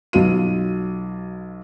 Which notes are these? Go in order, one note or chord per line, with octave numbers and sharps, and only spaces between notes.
B1 F#3 F4 D#7